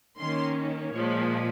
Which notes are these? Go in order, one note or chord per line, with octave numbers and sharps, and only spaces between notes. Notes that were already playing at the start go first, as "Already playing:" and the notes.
D#3 A#3 C#4 C6
A#2 F3 G#3 C#5